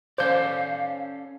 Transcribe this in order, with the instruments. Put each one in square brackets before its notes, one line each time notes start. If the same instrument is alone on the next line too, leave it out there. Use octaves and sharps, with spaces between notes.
[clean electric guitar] C#4 A4 D5 [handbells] C5 G6 [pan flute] F5